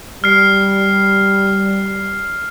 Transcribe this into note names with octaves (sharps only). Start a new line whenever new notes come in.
G3 F6 C7